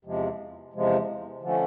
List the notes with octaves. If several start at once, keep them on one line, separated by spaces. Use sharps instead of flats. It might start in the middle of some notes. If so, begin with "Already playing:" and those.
E2 C3 F3 G#3
E2 C3 F3 G#3
D3 F3 A3 C#4